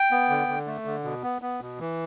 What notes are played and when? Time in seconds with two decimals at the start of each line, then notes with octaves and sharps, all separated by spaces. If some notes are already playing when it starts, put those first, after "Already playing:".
Already playing: G5
0.11 B3
0.29 D3
0.48 D3
0.67 A3
0.85 D3
1.04 B2
1.23 B3
1.42 B3
1.61 B2
1.79 E3